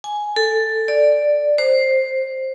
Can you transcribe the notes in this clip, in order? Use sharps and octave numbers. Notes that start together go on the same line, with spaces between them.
G#5
A4
D5
C5